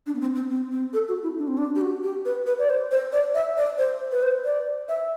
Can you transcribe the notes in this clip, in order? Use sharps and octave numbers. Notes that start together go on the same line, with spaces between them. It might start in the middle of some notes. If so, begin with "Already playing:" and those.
D4
B3
C4
C4
C4
C4
A4
F#4
E4
D4
C4
D4
G4
F#4
G4
B4
B4
D5
C5
C5
D5
E5
D5
C5
B4
C5
D5
E5